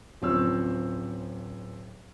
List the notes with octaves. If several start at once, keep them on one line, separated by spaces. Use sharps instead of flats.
D1 F3 C4 C#4 C#5 E6